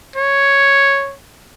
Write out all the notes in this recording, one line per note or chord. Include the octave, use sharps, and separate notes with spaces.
C#5